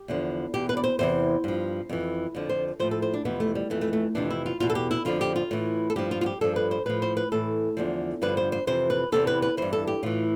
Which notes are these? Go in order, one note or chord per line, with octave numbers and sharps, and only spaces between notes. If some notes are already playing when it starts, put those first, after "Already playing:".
Already playing: G4
E2 D3 F3
E2 B2 G4
B4
D5
C5
E2 C3 E3 C5
G2 F3
F2 E3
F2 D3 F3
C5
A2 F3 C5
A4
C5
D4
F2 C3 E3 B3
A3
G3
F2 E3 A3
A3
A3
F2 C3 E3 D4
E4
F4
E2 B2 F4
A4
G4
E4
F2 D3 F3 F4
G4
F4
A2 E3
A4
G2 F3 G4
F4
F4
G4
G2 F3 A4
B4
C5
A2 F3 B4
C5
B4
A2 E3 A4
E2 D3 F3
G2 D3 F3 B4
C5
C5
F2 C3 E3 C5
B4
E2 C3 E3 A4
B4
B4
G2 E3 C5
A4
G4
A2 E3 F4